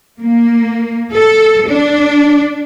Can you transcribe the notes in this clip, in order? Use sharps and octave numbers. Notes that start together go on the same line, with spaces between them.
A#3
A4
D4